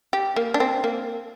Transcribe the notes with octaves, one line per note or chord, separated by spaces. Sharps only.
G4
A#3
D4
C4
A#3